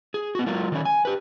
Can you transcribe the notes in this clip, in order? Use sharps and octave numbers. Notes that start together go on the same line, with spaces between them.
G#4
B3 F#4
F#3 G#3 F4 A#4
D#3 A3 C#4 C#5
G#5
G4 B4